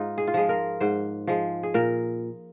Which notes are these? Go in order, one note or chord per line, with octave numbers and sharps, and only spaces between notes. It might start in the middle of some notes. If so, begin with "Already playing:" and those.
Already playing: G#2 D#4 F4
G#4
F4
F3 G#3 G#4
A#4
G#2 C5
F3 G#3
G#4
A#2 A#4